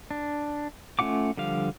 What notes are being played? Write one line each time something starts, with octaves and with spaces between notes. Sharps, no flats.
D4
A3 C#4 F4 F#5 D6
D3 F3 G3 F5